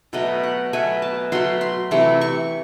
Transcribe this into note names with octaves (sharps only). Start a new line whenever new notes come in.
B2 F#3 A3 D#5
F#5
B2 F#3 A3 G#5
A5
B2 F#3 A3 C6
C6
C3 E3 A3 C#6
C#6